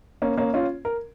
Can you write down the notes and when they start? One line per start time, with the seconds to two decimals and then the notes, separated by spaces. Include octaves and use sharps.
0.22 A#3 C#4
0.37 A#3 C#4
0.54 C#4 F4
0.85 A#4